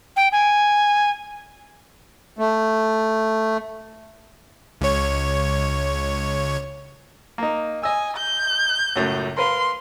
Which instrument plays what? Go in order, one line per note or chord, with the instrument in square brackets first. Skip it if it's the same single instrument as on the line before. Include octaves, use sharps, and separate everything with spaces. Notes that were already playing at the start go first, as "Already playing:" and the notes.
[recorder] G5
G#5
[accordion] A3
[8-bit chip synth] C#2 C#5
[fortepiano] A#3 D#4
[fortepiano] D#5 E6 [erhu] G#5
[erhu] G6
[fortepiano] C#2 F#2 A2
[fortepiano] A#4 B4 F5 [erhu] C6